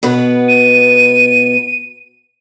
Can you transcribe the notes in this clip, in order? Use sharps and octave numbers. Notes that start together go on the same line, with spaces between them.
B2 B3 B4
D#7